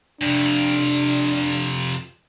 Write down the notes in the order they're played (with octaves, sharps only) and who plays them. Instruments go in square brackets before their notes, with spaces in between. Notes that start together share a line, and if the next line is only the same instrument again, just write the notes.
[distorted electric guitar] F2 C3 [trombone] D4